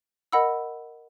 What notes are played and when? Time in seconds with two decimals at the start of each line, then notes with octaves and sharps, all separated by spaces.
0.32 A#4 D#5 F#5 B5 E6